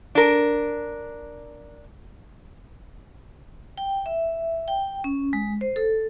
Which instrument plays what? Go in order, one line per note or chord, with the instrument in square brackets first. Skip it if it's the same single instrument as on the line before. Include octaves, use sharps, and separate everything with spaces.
[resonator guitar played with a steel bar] D4 A#4
[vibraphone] G5
E5
G5
C#4
G#3
C5
A4